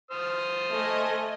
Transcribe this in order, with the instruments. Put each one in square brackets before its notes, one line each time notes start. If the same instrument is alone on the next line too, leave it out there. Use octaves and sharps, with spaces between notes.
[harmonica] C5 D#6 F6
[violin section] A3 D#5 G#5